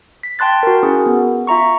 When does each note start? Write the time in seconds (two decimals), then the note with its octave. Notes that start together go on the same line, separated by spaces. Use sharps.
0.23 B6
0.39 G5 A5 C6 F#6 A6
0.63 F#4 A#4
0.83 C#4 E4 F#4 G#4 A#4
1.06 B3
1.47 F4 E5 A#5 C#6